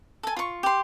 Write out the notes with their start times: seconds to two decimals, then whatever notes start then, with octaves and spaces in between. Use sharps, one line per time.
0.23 A4 G#5
0.37 F4 C#6
0.63 G4 C6